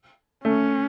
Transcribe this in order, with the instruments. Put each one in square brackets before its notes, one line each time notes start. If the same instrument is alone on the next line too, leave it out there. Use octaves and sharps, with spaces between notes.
[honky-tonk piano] A3 [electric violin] C#4